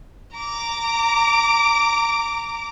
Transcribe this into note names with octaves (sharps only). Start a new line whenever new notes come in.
A#5 D6